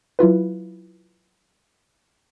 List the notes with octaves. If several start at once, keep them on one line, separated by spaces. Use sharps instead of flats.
F#3 E4 F4 B4